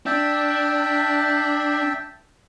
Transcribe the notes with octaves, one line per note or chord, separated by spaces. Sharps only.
D4 E5 G5 A5